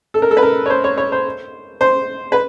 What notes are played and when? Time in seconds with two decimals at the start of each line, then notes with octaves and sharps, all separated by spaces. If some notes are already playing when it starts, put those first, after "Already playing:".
0.14 A4
0.22 A#4
0.31 A4
0.37 B4
0.43 A#4
0.66 C#5
0.70 C5
0.84 C#5
0.98 C#5
1.12 C5
1.81 C5
2.32 B4